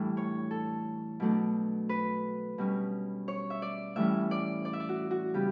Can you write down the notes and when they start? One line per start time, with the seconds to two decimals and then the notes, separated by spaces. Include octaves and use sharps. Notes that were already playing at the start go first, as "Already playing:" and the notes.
Already playing: A2 E3 G3 D4
0.17 C#5
0.51 A4
1.20 B2 F#3 A3 D4
1.89 B4
2.58 B2 G3 C#4
3.28 C#5
3.50 E5
3.62 D5
3.96 A2 E3 G3 C#4 E5
4.31 D5
4.65 D5
4.73 E5
4.80 D5
4.89 F#4
5.11 F#4
5.34 C#3 G3 B3 G4